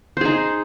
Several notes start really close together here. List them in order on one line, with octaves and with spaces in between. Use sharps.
C5 G#4 D#4